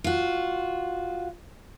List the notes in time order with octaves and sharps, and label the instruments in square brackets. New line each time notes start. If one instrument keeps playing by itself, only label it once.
[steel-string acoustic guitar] F4 F#4